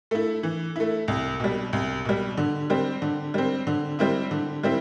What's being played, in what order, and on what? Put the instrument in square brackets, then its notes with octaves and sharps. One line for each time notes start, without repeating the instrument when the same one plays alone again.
[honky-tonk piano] A3 E4
E3
A3 E4
C2
B2 G3
C2
B2 G3
D3
G3 C4
D3
G3 C4
D3
G3 C4 E4
D3
G3 C4 E4